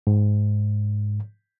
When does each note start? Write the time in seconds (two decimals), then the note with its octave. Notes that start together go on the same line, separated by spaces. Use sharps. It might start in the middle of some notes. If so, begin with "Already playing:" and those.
0.07 G#2